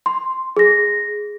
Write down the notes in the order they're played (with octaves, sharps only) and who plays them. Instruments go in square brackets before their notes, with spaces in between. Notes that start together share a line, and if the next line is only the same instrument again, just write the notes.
[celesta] C6
G#4 A#6